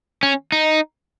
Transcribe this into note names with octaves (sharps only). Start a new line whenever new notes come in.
C#4
D#4